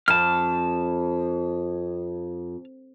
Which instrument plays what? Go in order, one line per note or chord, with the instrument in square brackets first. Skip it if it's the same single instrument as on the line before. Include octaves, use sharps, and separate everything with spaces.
[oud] F2 [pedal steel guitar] A5 F6